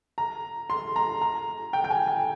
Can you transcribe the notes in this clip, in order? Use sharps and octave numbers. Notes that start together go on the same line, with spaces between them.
A#5
C6
A#5
A#5
G5
G5
G#5
G5